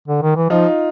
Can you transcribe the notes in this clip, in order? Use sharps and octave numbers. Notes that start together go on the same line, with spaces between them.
D3
D#3
E3
F3 D#4 F4